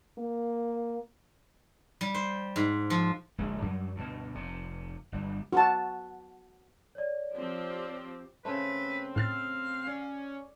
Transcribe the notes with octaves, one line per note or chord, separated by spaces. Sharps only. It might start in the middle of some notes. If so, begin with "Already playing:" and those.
A#3
G3
C5
G#2
F3
D1 A#1 G#3
F#2 F#3 G3
D2 G2 B2
F1 C3
G1 G3
F#4 A5
C#5 D5
F3 C4 G4
C#3 A3 C4 B4
A2 F5 F6 A6
C#4 D5